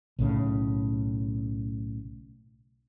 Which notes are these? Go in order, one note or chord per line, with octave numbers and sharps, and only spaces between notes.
B1 A2 C#3